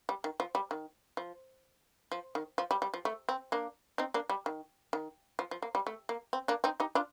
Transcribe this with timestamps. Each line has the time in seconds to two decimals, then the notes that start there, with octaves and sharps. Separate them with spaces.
0.09 G3
0.24 D#3
0.40 F3
0.55 G3
0.71 D#3
1.17 F3
2.12 F3
2.35 D#3
2.58 F3
2.71 G3
2.82 G3
2.94 F3
3.05 A3
3.29 C4
3.52 A#3 D4
3.98 C4 D#4
4.14 A#3 D4
4.30 G3
4.46 D#3
4.93 D#3
5.39 F3
5.51 F3
5.62 A#3
5.75 G3
5.87 A3
6.09 A#3
6.33 C4
6.48 A#3 D4
6.64 C4 D#4
6.80 D#4 G4
6.95 D4 F4